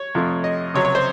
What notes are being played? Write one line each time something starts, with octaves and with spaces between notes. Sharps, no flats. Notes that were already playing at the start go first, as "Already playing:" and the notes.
Already playing: C#5
F2 C3 F3 A3
D#5
C#2 C3 F#3 C#5
C#5
C5